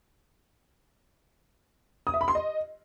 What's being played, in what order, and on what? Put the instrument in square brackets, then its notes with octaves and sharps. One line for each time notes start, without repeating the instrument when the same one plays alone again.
[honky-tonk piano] D#6
E5
B5
C6
D#5